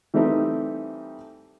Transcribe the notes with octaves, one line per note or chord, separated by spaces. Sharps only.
E3 G3 A3 C4 D#4 G4